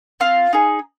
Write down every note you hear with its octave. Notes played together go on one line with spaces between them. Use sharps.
C4 F4 F5
D#4 G#4